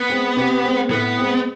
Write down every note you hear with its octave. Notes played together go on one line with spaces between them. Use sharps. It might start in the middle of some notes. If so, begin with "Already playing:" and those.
Already playing: B3
G#3 C4
C3
G#3 C4
A2 B3
G#3 C4